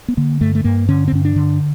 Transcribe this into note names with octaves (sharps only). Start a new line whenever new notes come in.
B3
D3 A#3
G2 A3
A3
G2 A#3
D3 C#4
C4
G2 C#4
D4
D3